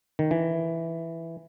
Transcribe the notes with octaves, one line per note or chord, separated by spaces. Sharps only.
D#3
E3